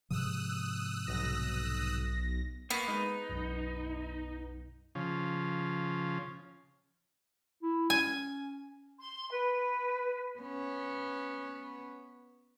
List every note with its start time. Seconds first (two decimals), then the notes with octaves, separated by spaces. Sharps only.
0.10 G#2 C3 F3 D#6 E6 F#6
1.07 B1 A#6
2.71 A#3 B3 B5 C#6
2.88 G#3 D#4 D#6 D#7
3.29 B1 F#2
4.95 C#3 F3
7.62 E4
7.90 C#4 G#5
8.99 C6
9.31 B4
10.39 B3 C#4